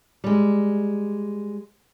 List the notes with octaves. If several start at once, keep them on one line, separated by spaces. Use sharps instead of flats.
G3 G#3